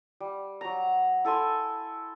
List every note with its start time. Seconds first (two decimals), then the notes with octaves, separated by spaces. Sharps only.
0.20 G3
0.61 F#3 A#5
1.25 E4 A4 G#5 C6